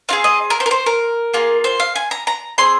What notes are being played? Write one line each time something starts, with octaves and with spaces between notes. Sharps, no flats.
C4 F4 G#4 F5
D#5
A#4
C5
A#4
C5
A#4
A#3 F4 G#4
C5
F5
G#5
A#5
A#5
C4 G#4 C6